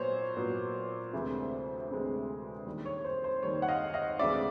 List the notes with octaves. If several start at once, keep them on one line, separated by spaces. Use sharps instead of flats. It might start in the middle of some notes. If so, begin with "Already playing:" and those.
Already playing: A#2 F#3 B3 C5 C#5
A#2 F#3 B3
D2 C3 E3 G#3
D2 C3 E3 G#3
D#2 D#3 G3
C#5
C5
C5
D#2 D#3 G3 C#5
F#5
D#5 F5
D#5 F5
D2 C3 E3 G#3 D5 E5